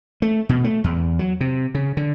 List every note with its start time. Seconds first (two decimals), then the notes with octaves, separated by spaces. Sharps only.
0.22 A3
0.49 B2
0.64 A3
0.84 E2
1.19 F#3
1.41 C3
1.75 C#3
1.97 D3